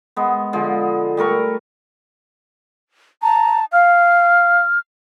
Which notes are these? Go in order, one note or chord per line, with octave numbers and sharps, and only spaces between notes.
G#3 B3
D3 F3 G#3
G3 A3 A#4 C#6
A5 A#5
F5 F6